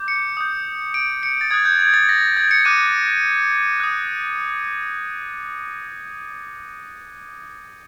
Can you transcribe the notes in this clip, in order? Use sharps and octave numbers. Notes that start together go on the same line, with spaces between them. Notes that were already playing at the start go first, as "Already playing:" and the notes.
Already playing: D6 G6
C#7
D#6 G6
D7
C#7
A6
D#6 F#6 G#6
G6
G#6
A6
A#6
G#6
C#7
D6 F#6 D#7
D#6 F#6